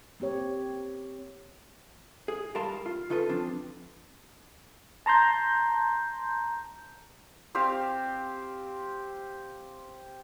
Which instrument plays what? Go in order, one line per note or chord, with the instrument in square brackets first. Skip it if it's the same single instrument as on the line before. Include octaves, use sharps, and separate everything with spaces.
[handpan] A#3 C4 G4 C#5
[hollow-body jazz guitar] G#4
G2 G3 A#4 F5 A5 C6
F4
C#3 D#4 F4 A4 B4
F3 C4 D4
[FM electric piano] A5 A#5 C6 G6
[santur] C4 G4 C5 F5